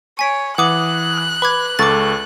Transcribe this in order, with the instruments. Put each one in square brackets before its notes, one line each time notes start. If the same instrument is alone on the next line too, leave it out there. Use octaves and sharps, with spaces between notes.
[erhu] C#5 [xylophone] G#5 B6 D7
[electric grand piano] E3 D#6 [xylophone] F#5 D6 F#7 [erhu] F#6
[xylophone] B4 D6 G#6 [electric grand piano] B5
[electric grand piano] C#2 A4 C#6 [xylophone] D6 A6